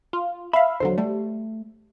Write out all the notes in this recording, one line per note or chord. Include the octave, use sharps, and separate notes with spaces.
F4
E5 F5 B5
E2 D3 F#3 C5
G3 A3